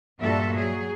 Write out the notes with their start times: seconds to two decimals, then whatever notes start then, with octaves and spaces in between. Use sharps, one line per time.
0.20 G2 A#2 G3 F#4 A4 E5
0.54 F#3 G#4